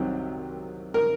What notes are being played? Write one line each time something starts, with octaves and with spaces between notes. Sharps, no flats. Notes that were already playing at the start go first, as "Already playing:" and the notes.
Already playing: C2 C3 D#3 F#3 C4
A#4